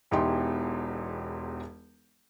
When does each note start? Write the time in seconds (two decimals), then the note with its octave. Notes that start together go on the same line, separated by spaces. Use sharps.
0.11 E1 E2 D#4 E4 G4 C6